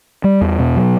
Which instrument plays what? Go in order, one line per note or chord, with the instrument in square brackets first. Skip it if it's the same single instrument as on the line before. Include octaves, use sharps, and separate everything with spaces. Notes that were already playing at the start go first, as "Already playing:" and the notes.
[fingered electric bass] G3
E2
B2
F#3